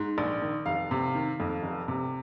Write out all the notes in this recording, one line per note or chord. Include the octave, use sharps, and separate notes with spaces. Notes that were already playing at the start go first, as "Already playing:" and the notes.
Already playing: G#2
A#1
D#3
F1 F5
C3
D#3
F2
F1
C3